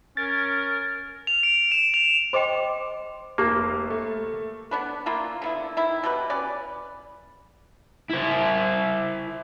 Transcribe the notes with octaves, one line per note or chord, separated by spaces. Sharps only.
C#4 A#4 A6
F7
D7
E7
F7
C5 D#5 G5 C6 D6
F1 A#3 E4 G4 A5 D6
A3
B3 D4 B4
A#3 D4 E4 F4
D3 B3 E4
D#3 E4
B2 G4 B4
C#4 B4 D5
E4 C5